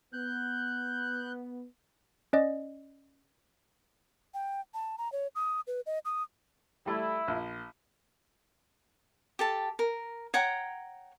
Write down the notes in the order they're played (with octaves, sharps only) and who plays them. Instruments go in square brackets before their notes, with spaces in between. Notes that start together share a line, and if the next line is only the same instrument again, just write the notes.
[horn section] B3 [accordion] F#6 G6
[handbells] C#4 D5 D#5
[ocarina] G5
A5
A#5
C#5
D#6
B4
D#5
D#6
[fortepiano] G3 A3 [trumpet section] E4
[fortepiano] A#1
[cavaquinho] G4 A4 A5
A#4
C#5 F#5 G5 A#5